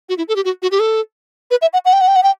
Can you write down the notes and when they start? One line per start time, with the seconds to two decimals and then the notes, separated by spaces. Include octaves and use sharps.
0.09 F#4
0.18 E4
0.28 A4
0.36 G4
0.45 F#4
0.62 F#4
0.71 G4
0.80 A4
1.51 B4
1.62 E5
1.73 F#5
1.85 F#5
1.93 G5
2.01 F#5
2.08 G5
2.16 F#5
2.23 G5